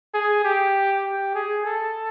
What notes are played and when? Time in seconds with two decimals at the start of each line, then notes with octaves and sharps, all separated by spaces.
0.14 G#4
0.45 G4
1.05 G4
1.35 G#4
1.65 A4